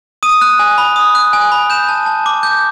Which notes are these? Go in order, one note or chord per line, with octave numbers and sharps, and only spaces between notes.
D#6 D#7
F#6
G#5
B5
D#6
F#6
G#5
B5
G6 E7
A5
A5
D6
G6